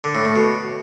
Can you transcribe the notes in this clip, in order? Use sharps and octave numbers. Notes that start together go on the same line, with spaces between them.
D3
A2
A2
B2